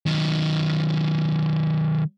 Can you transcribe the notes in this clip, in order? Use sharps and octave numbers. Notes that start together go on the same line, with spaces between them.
D#3 F#3